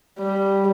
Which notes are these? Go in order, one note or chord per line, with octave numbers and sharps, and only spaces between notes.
G3